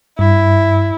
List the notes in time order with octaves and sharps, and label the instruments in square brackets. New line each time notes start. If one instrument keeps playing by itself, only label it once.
[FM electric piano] G2 [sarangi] E4